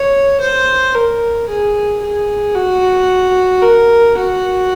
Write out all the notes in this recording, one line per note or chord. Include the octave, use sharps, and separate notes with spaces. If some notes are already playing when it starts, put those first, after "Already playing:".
Already playing: C#5
C5
A#4
G#4
G#4
F#4
A#4
F#4